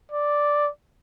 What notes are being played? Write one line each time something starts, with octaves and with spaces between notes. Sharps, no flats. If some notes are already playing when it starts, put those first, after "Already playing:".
D5